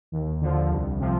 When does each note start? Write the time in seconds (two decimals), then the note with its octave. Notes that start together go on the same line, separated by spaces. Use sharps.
0.12 D#2
0.41 D3 F3
0.71 C2
1.00 C3 F3